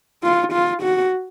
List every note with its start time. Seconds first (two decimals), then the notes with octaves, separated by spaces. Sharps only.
0.23 F4
0.53 F4
0.83 F#4